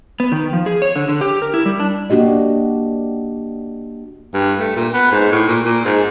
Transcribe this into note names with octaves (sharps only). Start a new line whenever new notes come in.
B3
D#3
F3
G#4
C#5
D3
D3
G4
A#4
E4
G3
D4
A#3 D4 F#4 G4 D#5
G2
A3
A#2
B3
G#2
A2
A#2
A#2
G#2